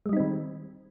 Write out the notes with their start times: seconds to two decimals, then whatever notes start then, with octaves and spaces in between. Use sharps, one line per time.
0.06 G#3
0.09 G3
0.13 D#4
0.17 C4
0.20 D#3